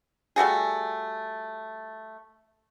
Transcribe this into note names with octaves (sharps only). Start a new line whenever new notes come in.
G3 A3 F#4 G#4